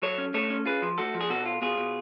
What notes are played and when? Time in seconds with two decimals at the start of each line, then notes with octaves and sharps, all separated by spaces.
0.02 F#3 A4 C#5
0.18 C#4
0.34 A3 A4 C#5
0.50 C#4
0.66 F4 G#4 B4
0.82 F3
0.98 A3 F#4 A4
1.14 F3
1.21 G#4
1.30 B2 F#4 A4
1.46 F4
1.62 B2 F4 G#4
1.78 B2